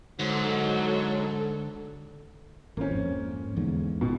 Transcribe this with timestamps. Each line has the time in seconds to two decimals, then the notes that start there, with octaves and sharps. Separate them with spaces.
0.19 G#2 D3 F#3 A4
2.77 G#1 A#3 C4 C#4
2.91 F2 G#2
3.56 E2 G#2 D3
4.01 G#1 B2